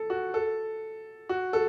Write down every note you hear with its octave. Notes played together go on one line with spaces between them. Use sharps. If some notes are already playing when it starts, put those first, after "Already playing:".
Already playing: A4
F#4
A4
F#4
A4